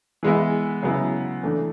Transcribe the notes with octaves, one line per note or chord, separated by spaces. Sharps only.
E3 G#3 B3 E4
C#3 F#3 B3 E4
E3 A3 D4